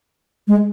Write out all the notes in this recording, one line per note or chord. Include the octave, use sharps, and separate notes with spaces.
G#3